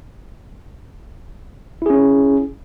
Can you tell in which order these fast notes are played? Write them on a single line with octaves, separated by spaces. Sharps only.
E4 G#4 C#4